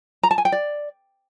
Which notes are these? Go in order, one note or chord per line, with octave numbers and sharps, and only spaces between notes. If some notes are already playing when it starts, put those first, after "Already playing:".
A#5
A5
G#5
G5
D5